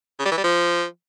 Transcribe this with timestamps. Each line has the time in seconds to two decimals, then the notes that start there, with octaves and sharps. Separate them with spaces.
0.19 C#3
0.25 G3
0.31 E3
0.38 G3
0.44 F3